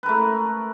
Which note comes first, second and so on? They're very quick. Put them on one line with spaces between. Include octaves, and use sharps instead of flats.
B4 A#4 A3